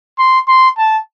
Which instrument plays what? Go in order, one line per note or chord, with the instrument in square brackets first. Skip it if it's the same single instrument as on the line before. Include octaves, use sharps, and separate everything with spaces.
[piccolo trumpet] C6
C6
A5